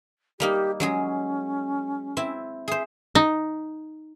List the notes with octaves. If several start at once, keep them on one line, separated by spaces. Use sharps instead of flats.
G3 A#3 D#4 G4
F#3 G#3 C#4 G#4
C4 E4
G#4 C5 E5
D#4